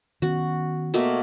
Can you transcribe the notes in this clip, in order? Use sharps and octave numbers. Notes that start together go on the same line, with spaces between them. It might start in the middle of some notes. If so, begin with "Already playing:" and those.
D#3 B3 C#4 F#4
B2 A3 A#3